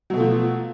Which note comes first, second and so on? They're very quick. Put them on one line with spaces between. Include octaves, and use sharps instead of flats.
F#3 B2 A3 F3